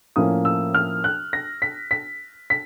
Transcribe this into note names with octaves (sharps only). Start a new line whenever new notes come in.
A2 F3 A#3 C#4 D#6
E6
F6
F#6
A#6
B6
B6
B6